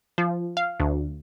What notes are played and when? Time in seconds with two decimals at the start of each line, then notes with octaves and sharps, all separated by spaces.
0.18 F3
0.57 F5
0.80 D2